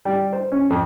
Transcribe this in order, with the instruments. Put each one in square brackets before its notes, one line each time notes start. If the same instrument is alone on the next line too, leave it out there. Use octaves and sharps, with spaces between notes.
[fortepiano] G3
C5
C#4
F2